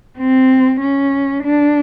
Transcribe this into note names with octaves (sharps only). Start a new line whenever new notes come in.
C4
C#4
D4